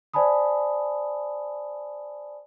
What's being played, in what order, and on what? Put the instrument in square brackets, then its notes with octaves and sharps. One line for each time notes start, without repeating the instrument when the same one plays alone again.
[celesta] C5 D5 G#5 A5 B5 D#6